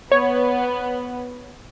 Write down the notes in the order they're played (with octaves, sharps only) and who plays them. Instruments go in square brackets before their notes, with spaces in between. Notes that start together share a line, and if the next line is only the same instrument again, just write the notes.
[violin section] B3 [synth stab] C#5